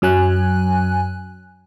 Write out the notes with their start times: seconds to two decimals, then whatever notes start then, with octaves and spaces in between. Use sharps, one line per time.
0.02 F#2 F#3 G#5 F#6